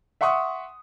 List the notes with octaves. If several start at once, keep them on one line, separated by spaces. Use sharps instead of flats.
E5 F#5 C6 C#6 D#6